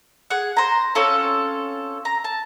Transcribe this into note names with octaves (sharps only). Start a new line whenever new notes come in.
G#4 F#5
C5 A#5
C4 C#4 F4 A4
A#5
A5